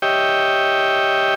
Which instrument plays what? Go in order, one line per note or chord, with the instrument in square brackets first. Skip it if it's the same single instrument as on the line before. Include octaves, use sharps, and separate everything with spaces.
[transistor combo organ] G4 C#5 D#5 E5 G5